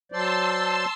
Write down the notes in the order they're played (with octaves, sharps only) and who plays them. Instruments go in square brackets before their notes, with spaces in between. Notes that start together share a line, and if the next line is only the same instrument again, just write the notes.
[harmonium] F#3 C5 D5 [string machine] A5 C6 E6